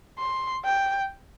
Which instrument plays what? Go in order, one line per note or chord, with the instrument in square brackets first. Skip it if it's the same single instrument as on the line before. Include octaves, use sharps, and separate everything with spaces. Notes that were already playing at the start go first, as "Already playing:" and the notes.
[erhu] C6
G5